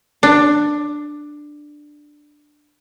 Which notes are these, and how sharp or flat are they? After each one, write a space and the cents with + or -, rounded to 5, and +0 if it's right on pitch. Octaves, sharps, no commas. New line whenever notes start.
D4 +10